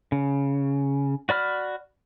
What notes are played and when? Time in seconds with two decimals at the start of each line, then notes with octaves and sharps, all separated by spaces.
0.12 C#3
1.29 F#4 D5 B5 F6